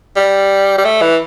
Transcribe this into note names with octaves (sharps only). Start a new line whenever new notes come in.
G3
G3
A3
E3